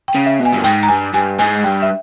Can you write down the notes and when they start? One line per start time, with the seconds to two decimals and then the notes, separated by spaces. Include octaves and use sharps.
0.08 G5
0.14 C#3
0.26 E5
0.39 B2
0.45 G#5
0.53 G2
0.64 G#2 G5
0.83 A#5
0.88 G2 G#5
1.14 G2 G#5
1.39 G#2 G#5
1.64 G2 G5
1.82 E5